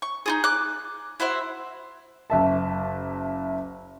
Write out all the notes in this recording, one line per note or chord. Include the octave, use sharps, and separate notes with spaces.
C#6
D#4 F4 G#4
D6 F#6
E4 F#4 C5 E5
F#1 E5 A5